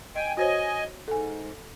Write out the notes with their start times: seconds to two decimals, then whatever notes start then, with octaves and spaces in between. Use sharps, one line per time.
0.16 D#5 G5 G#5
0.37 F#4 C5 C#5 D#5 G#5
1.08 G#2 A4 G#5